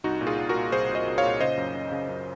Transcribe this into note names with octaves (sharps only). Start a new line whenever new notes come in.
C2 D#4 F#4
A#2
F4 G#4
A#2
F#4 A#4
A#2
C2 G#4 C5
C2
C5 D#5
C2
C#5 F5
A#2
C#3 C5 D#5
F#2
C#3
C#3
F#2